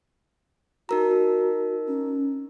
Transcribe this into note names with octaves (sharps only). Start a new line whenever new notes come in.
D#4 F#4 A#4 A#5
C#4